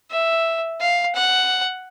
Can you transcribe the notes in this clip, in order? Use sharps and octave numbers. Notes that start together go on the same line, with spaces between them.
E5
F5
F#5